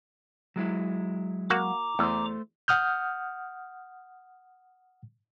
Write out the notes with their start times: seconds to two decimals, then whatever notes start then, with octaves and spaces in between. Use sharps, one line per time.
0.56 F#3 G#3 E4
1.50 A#3 F#4 F#5 A#5 D6
1.99 E2 A3 C5
2.68 F#5 D#6 F6 G6